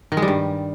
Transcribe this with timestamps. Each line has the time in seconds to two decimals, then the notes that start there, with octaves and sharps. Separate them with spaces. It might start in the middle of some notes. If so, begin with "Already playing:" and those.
0.12 D#3
0.17 G#3
0.22 G3
0.28 G2